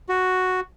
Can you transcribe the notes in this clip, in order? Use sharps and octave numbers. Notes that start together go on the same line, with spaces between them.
F#4